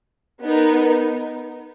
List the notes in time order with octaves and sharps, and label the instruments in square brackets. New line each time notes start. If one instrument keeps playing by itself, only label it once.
[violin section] B3 D#4 A#4